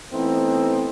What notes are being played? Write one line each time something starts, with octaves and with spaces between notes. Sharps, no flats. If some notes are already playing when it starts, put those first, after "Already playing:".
E3 A3 B3 C4 D#4 E4